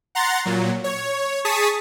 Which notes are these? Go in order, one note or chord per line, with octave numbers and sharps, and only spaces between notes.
F#5 A#5 C6 A6
A#2 F#3
C#5
G#4 A5 C#6 D#6 B6